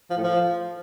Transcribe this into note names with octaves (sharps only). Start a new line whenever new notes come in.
F3
A2
F3